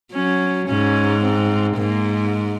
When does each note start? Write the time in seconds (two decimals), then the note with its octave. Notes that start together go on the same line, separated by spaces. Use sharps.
0.13 F#3 C#4
0.68 G#2 C#4
1.23 C4
1.76 G#2 A#3